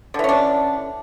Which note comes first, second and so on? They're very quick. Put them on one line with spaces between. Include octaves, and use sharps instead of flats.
D3 E3 C#4 D4